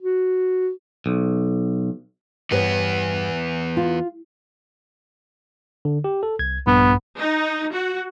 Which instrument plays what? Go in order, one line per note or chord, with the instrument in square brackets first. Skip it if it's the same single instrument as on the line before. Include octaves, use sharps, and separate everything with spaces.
[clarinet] F#4
[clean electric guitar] B1
[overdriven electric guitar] E2 B3 [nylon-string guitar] G2 B4 C#5
[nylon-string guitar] F4
[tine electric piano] D3
G4
A4
C2 G#6
[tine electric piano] A#1 G2 [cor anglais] B3
[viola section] D#4
F#4